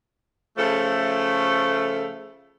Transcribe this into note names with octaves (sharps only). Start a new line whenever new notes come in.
C#3 F3 A3